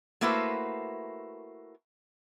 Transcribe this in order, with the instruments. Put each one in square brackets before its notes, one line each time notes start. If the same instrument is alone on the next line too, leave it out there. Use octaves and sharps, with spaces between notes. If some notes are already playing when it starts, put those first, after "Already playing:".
[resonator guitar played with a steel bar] A3 A#3 E4 F#4 B4 C5